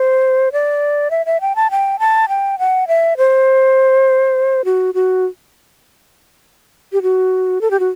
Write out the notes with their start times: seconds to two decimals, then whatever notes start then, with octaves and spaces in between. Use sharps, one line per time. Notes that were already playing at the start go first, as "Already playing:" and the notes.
Already playing: C5
0.52 D5
1.11 E5
1.26 E5
1.41 G5
1.56 A5
1.71 G5
1.99 A5
2.29 G5
2.59 F#5
2.88 E5
3.17 C5
4.65 F#4
4.94 F#4
6.93 G4
7.02 F#4
7.61 A4
7.71 G4
7.80 F#4